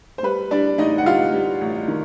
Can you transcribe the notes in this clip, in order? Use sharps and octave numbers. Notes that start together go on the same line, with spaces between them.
C5
G3 B4
G3 D4 D5
A1 D#4 D#5
F#5
G3 F4 F5
G3
A1
D#3